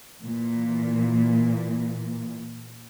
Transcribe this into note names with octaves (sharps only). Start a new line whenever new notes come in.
A#2 E3